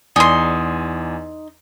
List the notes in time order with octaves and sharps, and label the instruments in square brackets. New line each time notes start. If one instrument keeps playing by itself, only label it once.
[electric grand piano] E2 D5 G#5 [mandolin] D#4 C6